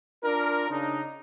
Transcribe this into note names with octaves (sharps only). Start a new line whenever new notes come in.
D4 F4 A#4
C#3 D4 D#4